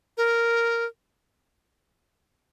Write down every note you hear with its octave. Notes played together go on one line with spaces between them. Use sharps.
A#4